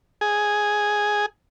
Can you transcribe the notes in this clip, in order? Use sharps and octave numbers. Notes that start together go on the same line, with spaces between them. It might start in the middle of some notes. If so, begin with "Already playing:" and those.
G#4